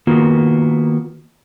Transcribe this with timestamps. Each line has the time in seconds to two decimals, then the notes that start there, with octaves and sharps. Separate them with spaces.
0.07 D#3 A#3 B3 F4 F#4